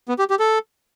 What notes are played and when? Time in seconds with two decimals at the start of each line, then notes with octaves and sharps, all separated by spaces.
0.09 B3
0.19 G4
0.30 G4
0.40 A4